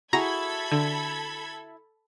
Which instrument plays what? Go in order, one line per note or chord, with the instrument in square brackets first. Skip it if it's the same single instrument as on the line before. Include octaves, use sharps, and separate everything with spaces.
[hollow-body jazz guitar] E4 F#4 G#4 [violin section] A4 B5 G#6 [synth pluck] A#5
[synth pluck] D3